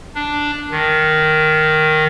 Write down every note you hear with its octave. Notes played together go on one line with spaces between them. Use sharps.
D4
D#3